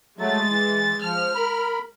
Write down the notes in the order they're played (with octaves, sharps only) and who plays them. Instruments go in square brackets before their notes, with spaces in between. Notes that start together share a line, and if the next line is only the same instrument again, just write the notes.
[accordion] F#3 A3 [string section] G#3 A6
[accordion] E3
[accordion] F3 [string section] F6
[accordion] A#4 B5